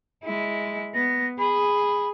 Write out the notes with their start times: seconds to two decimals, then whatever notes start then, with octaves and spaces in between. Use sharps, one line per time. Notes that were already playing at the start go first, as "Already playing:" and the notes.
0.23 G#3 E4
0.94 B3 A#6
1.39 G#4 B5